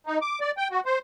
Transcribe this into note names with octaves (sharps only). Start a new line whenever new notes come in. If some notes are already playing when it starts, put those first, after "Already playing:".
D#4
D6
D5
G5
F#4
C5